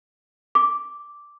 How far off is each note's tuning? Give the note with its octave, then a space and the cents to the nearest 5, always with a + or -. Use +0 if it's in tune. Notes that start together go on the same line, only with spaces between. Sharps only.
D6 -5